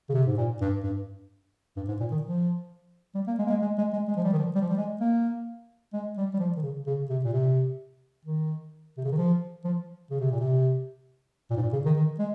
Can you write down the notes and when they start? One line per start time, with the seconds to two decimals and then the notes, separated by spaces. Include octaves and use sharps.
0.09 C#3
0.14 C3
0.27 G#2
0.37 A#2
0.61 G2
0.83 G2
1.77 G2
1.88 G#2
2.00 A#2
2.12 D#3
2.22 F3
3.15 G3
3.27 A#3
3.38 G#3
3.46 A#3
3.50 G#3
3.62 G#3
3.78 G#3
3.93 G#3
4.08 G#3
4.17 F3
4.24 G3
4.33 D#3
4.39 F3
4.55 G3
4.61 F3
4.69 G3
4.77 G#3
5.01 A#3
5.93 G#3
6.17 G3
6.34 G3
6.39 F3
6.56 D#3
6.63 C#3
6.86 C#3
7.09 C3
7.24 A#2
7.33 C3
8.25 D#3
8.97 C3
9.04 C#3
9.12 D#3
9.18 F3
9.64 F3
10.10 C#3
10.21 C3
10.31 A#2
10.40 C3
11.50 A#2
11.56 G#2
11.62 A#2
11.73 C#3
11.85 D#3
11.96 D#3
12.19 G#3